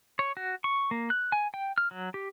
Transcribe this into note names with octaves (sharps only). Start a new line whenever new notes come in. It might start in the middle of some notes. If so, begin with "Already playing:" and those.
C#5
F#4
C#6
A#3
F#6
G#5
G5
F6
F#3
G4